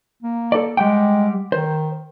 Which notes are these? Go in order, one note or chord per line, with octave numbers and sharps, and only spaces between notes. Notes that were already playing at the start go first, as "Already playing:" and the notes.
A#3
A4 D5
G3 G#3 F#5 G5
D#3 C5